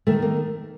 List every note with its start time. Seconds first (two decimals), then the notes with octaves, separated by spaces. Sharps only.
0.07 D#3 A3
0.22 A#3